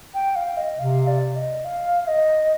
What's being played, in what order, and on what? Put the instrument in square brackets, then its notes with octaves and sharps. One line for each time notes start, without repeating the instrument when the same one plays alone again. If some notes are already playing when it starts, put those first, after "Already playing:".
[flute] G5
F5
D#5
[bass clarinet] C3 [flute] F5
[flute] D5
D#5
F5
F5
D#5